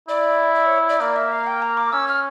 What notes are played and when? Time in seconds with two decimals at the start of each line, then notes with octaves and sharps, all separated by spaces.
0.08 E4 D5
0.54 D5
0.66 C#5
0.89 D5
1.00 A#3 D5
1.16 E5
1.32 F5
1.47 G5
1.62 A#5
1.77 D6
1.92 C#4 E6
2.08 F6